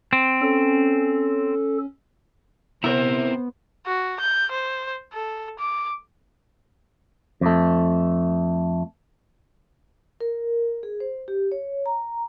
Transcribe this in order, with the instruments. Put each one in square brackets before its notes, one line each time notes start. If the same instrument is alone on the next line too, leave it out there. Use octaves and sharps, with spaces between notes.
[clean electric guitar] C4
[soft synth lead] C#4 [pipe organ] A4
[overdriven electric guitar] C3 A#5 [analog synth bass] B3 [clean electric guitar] E4 A#4 [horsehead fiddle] C5
[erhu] F#4
G6
C5
A4
D6
[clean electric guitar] F2 A3
[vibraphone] A#4
G#4
C5
G4
C#5
A#5